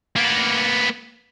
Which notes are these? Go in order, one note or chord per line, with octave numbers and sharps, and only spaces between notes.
A#3 B3